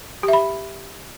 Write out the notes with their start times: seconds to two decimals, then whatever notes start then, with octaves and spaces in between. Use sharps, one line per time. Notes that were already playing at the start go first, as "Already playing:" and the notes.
0.23 G4
0.28 E5
0.33 B5